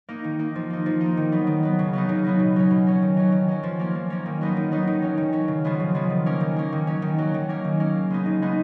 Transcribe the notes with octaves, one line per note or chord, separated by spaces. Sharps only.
A#3 D#4
D#3
A#3 D#4
F3
A#3 D#4
F3
D#4
A#3
D#3
F#3 B3
D#3
F#3 B3
C#3
F#3 B3 D#4
C#3
F#3 B3 D#4
B2
F#3 C#4
B2
F#3 C#4
D#3
F#3 C#4
D#3
F#3 C#4
F3
A#3 C#4
F3
A#3 C#4
D#3
F#3 B3 D#4
D#3
F#3 B3 D#4
D#3
F#3 C#4
D#3
F#3 C#4
C#3
F3 G#3 B3
C#3
F3 G#3 B3
D#3
A#3 C#4
D#3
A#3 C#4
D#3
F#3 C#4
D#3
F#3 C#4
D#3
A#3 C#4
D#3
A#3 C#4
C#3
G#3 B3 D#4
C#3
G#3 B3 D#4